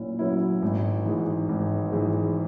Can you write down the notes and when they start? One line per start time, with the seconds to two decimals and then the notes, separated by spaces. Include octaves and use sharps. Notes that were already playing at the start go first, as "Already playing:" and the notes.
Already playing: A#2 F#3 C#4 E4
0.19 F#3 C#4 E4
0.62 G#1
1.06 G#2 E3 G#3
1.49 G#1
1.92 G#2 E3 G#3